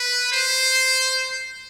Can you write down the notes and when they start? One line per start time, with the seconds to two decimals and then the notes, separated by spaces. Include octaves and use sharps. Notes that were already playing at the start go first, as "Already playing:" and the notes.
Already playing: B4
0.32 C5